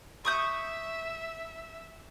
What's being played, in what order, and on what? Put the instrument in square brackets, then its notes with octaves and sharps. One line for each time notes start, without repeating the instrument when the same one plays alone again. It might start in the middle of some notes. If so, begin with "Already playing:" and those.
[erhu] E5 [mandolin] C#6 D#6 G6